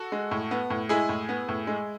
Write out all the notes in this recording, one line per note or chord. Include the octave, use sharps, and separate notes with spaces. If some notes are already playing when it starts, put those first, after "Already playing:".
Already playing: F#4 A4
G#3
A2
B3
A2
G#3 E4 G#4
A2
B3
A2
G#3